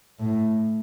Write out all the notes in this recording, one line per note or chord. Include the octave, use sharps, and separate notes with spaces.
A2